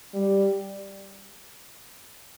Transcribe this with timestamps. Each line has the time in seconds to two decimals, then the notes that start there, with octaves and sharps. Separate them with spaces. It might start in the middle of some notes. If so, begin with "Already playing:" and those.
0.14 G3